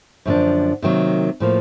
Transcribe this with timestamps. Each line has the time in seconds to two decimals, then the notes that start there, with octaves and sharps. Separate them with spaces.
0.25 F#2 D3 F3 A#3 D4
0.82 C3 D#3 F#3 A#3
1.40 A2 F3 A#3